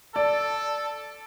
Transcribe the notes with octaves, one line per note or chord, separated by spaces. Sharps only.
A4 D5